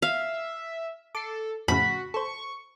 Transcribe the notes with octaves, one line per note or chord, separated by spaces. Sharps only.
E5 F5
A4 D6 C7
F2 A2 C#3 F#4 B5
A4 C5 C#6